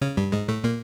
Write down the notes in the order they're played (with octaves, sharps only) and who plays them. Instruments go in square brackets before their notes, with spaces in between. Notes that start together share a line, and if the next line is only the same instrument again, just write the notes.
[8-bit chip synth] C#3 C#4
G2 G3
G#2 G#3
A2 A3
A#2 A#3